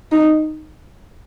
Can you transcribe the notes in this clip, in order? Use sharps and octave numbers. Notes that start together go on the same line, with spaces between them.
D#4